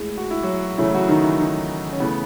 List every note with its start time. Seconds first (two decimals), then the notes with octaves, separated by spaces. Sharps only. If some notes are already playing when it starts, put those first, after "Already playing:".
Already playing: A2 G#3 G#4
0.17 F#4
0.30 E4
0.43 F#3 F#4
0.78 C#3 E3 F#3 A3 E4
0.94 F#3 F#4
1.08 D#3 D#4
1.24 E3 E4
1.40 D#3 D#4
1.93 C#4
2.00 C#3 E3 A3 B3